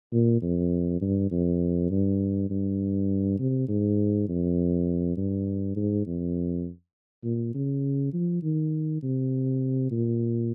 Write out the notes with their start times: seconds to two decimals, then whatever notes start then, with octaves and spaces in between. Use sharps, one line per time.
0.12 A#2
0.42 F2
1.01 G2
1.31 F2
1.91 G2
2.50 G2
3.39 C3
3.68 G#2
4.28 F2
5.17 G2
5.76 G#2
6.06 F2
7.24 A#2
7.54 C#3
8.13 F3
8.43 D#3
9.03 C3
9.91 A#2